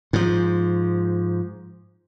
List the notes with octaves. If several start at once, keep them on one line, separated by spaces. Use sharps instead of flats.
G#2 F3